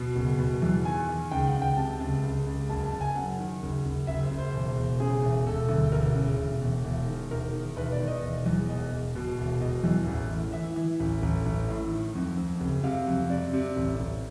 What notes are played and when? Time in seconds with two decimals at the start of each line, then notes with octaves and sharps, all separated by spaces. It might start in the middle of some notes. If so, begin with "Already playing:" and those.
Already playing: B2
0.16 F#1
0.39 B2
0.62 E2
0.85 D#3 G#5
1.09 D#3
1.31 C#2 G5
1.47 F#5
1.55 C#2
1.62 G5
1.77 C3 A5
2.00 C#2
2.24 C#2
2.47 C#2
2.69 F#1 A5
2.85 A5
2.93 F#1
3.01 G#5
3.15 F#2 F#5
3.39 D#3
3.62 F#1
3.85 F#1
4.07 F#1 E5
4.23 C5
4.31 F#1
4.39 C5
4.54 E1
4.76 E1
5.00 C#3 G#4
5.23 E1
5.46 E1 A4
5.69 D2
5.92 E1 A#4
6.15 C#3
6.38 E1
6.62 E1
6.84 E1
7.07 D#3
7.31 E1 A#4
7.53 D#3
7.76 E1 B4
7.92 D5
8.00 D#3
8.08 D#5
8.23 E1
8.46 E2
8.69 E1 D#5
8.91 E1
9.15 B2
9.38 E1
9.61 B2 D#5
9.83 E2
10.07 A1
10.31 A2
10.53 E3 E5
10.76 E3
11.00 A1
11.23 A1
11.46 A1
11.68 A2
11.91 D#3
12.15 F2
12.37 F2
12.60 F#1
12.83 C3 F5
13.07 F2
13.30 C3 D5
13.53 C3
13.76 A1
13.99 A1